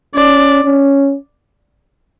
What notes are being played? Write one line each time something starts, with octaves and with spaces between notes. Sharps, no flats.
C#4 D5
C#4